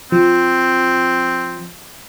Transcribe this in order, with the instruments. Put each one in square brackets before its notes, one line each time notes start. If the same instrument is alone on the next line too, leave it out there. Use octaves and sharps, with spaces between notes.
[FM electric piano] F3 [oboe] C4